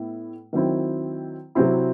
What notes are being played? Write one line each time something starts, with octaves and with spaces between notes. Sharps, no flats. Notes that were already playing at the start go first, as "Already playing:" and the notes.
Already playing: A2 B3 E4
D#3 F#3 C4 E4
C3 F#3 C4 E4